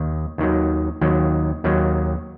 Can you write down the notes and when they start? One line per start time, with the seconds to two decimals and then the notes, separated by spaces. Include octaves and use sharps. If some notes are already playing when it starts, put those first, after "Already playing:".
Already playing: D#2 D#3
0.38 D#2 D#3 F#3
1.01 D#2 D#3 F#3
1.64 D#2 D#3 F#3